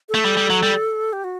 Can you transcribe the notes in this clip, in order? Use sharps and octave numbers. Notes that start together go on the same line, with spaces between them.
A4
A3
G3
G3
F#3
G3
G4
F#4